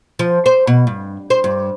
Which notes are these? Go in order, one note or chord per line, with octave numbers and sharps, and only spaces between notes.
F3
C5
B2
G2
C5
G2